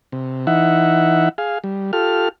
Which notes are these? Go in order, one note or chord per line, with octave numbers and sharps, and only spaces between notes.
C3
E3 D#4 E5 F#5
G#4 F5
G3
F4 G4 A4 F6